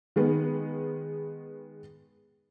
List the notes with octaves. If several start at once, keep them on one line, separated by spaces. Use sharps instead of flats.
D#3 G#3 B3